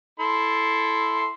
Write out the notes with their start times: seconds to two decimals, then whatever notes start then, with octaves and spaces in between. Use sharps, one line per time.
0.20 E4 A4 C6